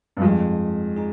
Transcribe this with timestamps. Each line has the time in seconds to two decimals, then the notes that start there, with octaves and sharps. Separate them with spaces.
0.17 G2
0.22 F2 F3 G#3 D#4 G#4
0.96 D#4 G#4